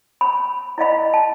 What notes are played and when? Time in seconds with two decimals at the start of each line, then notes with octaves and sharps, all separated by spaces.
0.21 B5
0.78 E4 D5 D#5 F5 B5
1.14 A5